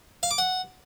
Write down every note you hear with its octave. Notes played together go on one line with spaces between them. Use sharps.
F5
D6
F#5